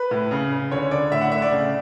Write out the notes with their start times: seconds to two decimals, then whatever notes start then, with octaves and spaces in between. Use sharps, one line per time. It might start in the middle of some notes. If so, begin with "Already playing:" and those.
Already playing: B4
0.11 A2
0.31 C#3
0.52 C#3
0.71 D3 C#5
0.91 D3 D5
1.12 A2 E5
1.21 F#5
1.32 A3 E5
1.42 D5
1.51 C#3